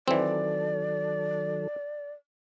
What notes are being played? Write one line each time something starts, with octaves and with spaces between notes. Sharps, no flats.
D#3 E3 F#3 C4 A4 D5